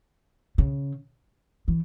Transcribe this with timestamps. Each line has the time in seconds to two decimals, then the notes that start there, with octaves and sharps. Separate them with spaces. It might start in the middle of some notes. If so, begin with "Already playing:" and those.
0.58 C#3
1.68 E3